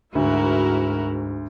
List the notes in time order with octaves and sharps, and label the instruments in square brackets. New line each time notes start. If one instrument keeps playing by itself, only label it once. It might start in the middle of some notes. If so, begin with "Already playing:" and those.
[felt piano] D2 [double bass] G#2 [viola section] E4 F#4 A#4